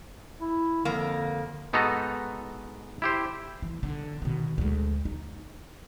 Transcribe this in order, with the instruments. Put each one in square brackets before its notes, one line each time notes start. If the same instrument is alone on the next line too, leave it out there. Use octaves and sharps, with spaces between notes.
[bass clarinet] E4
[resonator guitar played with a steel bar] F2 A#3 [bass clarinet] D3
[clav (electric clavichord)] G#2 B3 D#4 F#4 A4 A#5
E4 G4 C5
[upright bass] E3
D3
B2 D#3
D2 G#3
D#4